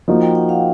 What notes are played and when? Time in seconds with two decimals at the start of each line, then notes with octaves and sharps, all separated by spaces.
0.08 F3 A#3 D#4 F#4
0.22 G5
0.35 F#5
0.49 F5